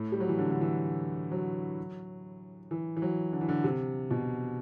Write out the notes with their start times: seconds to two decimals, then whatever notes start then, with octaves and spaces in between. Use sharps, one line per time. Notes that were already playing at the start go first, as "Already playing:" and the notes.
Already playing: A2
0.12 G3
0.20 F#3
0.29 E3
0.39 D3
0.51 D3
0.61 E3
1.32 F#3
2.71 E3
2.97 E3
3.02 F#3
3.33 D3
3.41 E3
3.49 D3
3.64 C3
4.11 B2